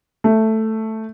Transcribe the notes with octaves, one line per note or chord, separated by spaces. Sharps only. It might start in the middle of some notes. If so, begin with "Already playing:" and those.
A3